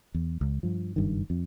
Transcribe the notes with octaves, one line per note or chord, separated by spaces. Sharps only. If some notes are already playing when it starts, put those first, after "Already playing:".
E2
C#2
G2 F3
F#1 G2 D#3
F2